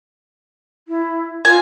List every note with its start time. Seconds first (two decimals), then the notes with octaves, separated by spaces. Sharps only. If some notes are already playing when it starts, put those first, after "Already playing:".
0.88 E4
1.45 F4 G#5